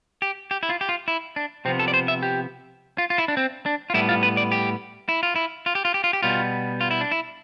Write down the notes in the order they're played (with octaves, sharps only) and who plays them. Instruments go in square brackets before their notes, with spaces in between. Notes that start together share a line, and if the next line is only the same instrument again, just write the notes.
[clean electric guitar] G4
G4
E4
F4
G4
F4
E4
D4
C3 F3 B3 C4
A4
D5
C5
E5
G4
F4
F4
E4
D4
C4
D4
F4
A2 G3 B3 E4
F4
B4
D5
G4
E4
F4
E4
F4
G4
F4
G4
F4
G4
B2 G3 B3 F4
F4
E4
D4
E4